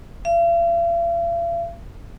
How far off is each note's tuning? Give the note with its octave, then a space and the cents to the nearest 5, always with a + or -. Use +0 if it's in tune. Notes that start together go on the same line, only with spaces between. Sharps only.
F5 -45